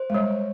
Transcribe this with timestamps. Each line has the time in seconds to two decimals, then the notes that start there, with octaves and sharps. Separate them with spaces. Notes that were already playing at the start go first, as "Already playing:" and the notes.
Already playing: C5
0.10 G#3
0.14 G3 C#5